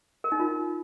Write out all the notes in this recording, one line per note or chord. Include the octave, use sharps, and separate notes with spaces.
A#4
D#4
F4